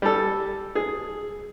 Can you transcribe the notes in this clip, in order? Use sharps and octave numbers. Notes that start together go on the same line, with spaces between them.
G3 A4
G#4